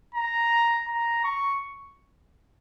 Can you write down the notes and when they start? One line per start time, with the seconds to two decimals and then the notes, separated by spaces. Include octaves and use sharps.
0.15 A#5
0.88 A#5
1.24 C#6